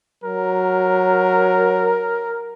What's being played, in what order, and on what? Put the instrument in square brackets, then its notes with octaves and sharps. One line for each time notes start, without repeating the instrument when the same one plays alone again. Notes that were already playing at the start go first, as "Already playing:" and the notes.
[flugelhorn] F#3 [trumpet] A#4